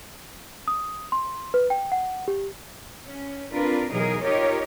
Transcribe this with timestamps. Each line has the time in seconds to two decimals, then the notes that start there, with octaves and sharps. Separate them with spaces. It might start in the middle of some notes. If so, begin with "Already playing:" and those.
0.68 D#6
1.12 C6
1.54 B4
1.70 G5
1.92 F#5
2.28 G4
3.07 C#4
3.52 C4 D4 F4 A#4 B4
3.92 B2 E3 F#3 D#4 G#4 A#4
4.23 D#4 F4 G4 A#4 C#5 D#5